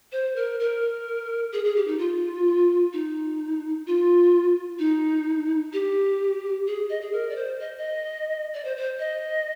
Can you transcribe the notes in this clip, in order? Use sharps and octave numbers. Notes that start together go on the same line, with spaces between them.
C5
A#4
A#4
G#4
G#4
G4
D#4
F4
D#4
F4
D#4
G4
G#4
D#5
G#4
A#4
D5
C5
D#5
D#5
D5
C5
C5
D#5